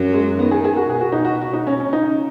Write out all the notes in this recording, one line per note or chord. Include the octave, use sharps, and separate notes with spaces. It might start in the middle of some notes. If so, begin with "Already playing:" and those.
Already playing: F#2 F#3
G#3
D#3 B3
G#4
G#4
F#4
B2 G#4
F#4
D#4
F#4
F#4
D#4
C#4
C#4
C#3 D#4